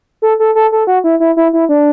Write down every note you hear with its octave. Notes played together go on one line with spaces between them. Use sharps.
A4
A4
A4
A4
F#4
E4
E4
E4
E4
D4